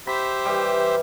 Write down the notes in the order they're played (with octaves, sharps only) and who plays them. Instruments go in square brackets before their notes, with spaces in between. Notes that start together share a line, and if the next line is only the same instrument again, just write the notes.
[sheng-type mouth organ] G4 C5 E5 [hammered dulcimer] B5
[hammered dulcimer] E3 G3